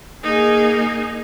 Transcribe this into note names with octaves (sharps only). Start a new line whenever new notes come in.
A#3 D#4 G#4